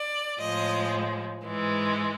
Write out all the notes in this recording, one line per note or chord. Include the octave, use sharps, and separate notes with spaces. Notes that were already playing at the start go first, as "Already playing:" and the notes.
Already playing: D5
A2 F3 G#3 D#5
G#2 E3 G#3